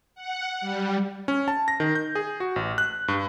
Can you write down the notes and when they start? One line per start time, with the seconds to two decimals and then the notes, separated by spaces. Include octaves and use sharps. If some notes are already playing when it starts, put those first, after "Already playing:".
0.15 F#5
0.61 G3
1.28 C#4
1.48 A5
1.68 A#6
1.80 D#3
1.95 G6
2.15 G#4
2.40 F#4
2.56 A1
2.78 F#6
3.08 G2